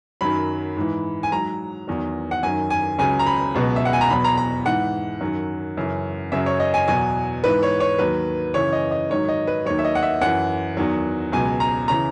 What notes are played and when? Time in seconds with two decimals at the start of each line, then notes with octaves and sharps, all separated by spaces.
0.21 F#2 D#3 F#3 B5
0.77 G#2 E3
1.23 G#5
1.32 G#2 F#3 A#5
1.88 E2 D#3 F#3
2.31 F#5
2.43 F#2 D#3 F#3 G#5
2.70 G#5
2.98 C#2 C#3 F#3 G#5
3.19 A#5
3.26 B5
3.54 C#2 B2 F#3
3.76 E5
3.85 F#5
3.93 G#5
4.01 A#5
4.10 E2 B2 F#3 B5
4.24 A#5
4.38 A#5
4.65 G#2 E3 F#5
5.21 F#2 D#3 F#3
5.77 F#2 C#3 E3
6.32 F#2 C#3 F#3 E5
6.46 C#5
6.60 D#5
6.74 G#5
6.88 E2 B2 F#3 G#5
7.44 G#2 E3 B4
7.63 C#5
7.80 C#5
7.99 D#2 D#3 F#3 B4
8.54 F#2 C#3 E3 C#5
8.73 D#5
8.91 D#5
9.10 G#2 D#3 F#3 C#5
9.29 D#5
9.47 B4
9.65 D#2 D#3 F#3 C#5
9.79 E5
9.85 D#5
9.95 F#5
10.03 E5
10.21 F#2 E3 F#5
10.77 E2 D#3 F#3
11.32 C#2 B2 F#3 G#5
11.60 A#5
11.88 C#3 E3 A#5